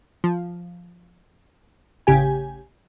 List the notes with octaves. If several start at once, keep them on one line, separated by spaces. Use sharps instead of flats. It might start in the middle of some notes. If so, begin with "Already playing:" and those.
F3
A1 C#3 G4 G#5